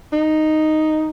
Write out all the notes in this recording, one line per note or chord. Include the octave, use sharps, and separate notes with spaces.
D#4